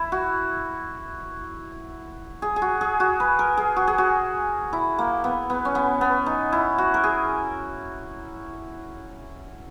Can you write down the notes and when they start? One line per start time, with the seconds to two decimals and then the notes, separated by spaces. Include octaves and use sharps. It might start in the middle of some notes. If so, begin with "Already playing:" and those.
Already playing: E4
0.12 F#4
2.42 G#4
2.56 G#4
2.62 F#4
2.81 G#4
3.00 F#4
3.20 B4
3.39 A#4
3.57 G#4
3.76 F#4
3.88 G#4
3.98 F#4
4.73 E4
4.99 A#3
5.24 B3
5.50 B3
5.65 C#4
5.75 B3
6.01 B3
6.26 D#4
6.52 E4
6.78 F#4
6.94 A#4
7.04 G#4